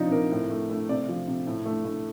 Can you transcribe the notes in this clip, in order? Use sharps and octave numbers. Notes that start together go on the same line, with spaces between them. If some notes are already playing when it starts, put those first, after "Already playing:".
Already playing: C3 F3 D4 D#4
C3 A#4
A2
A3
A3
C3 D5
F3
C3
A2
A3
A3